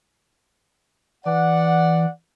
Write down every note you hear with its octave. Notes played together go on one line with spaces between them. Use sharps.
E3 D5 F#5